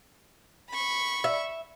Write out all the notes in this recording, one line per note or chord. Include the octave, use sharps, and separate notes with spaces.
B5 C#6
E5